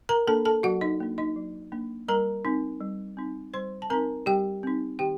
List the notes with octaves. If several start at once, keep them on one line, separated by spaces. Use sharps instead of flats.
A#4 A#5
A#3 D4 A4 A5
A4 A5
F#3 F#4 F#5
D#4 D#5
A#3 D4
D#4 D#5
F#3
A#3 D4
G3 A#4 A#5
C4 D#4
G3
C4 D#4
G3 C5 C6
A5
C4 D#4 A#4 A#5
G3 G4 G5
C4 D#4
D#3 G4 G5